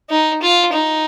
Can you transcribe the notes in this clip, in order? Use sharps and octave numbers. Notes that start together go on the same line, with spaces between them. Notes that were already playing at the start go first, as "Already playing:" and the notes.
D#4
F4
D#4